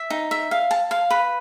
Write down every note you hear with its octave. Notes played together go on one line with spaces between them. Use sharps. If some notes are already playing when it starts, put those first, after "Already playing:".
Already playing: E5
D#4
E5
F5
A5
F5
B4